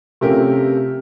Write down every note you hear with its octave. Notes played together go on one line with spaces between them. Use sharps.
C3 F3 A3 C#4 G4 A#4